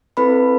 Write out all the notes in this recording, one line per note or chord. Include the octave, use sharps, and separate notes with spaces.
C4 E4 A4 B4 B5